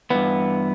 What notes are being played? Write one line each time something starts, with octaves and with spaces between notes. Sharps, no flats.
G2 E3 B3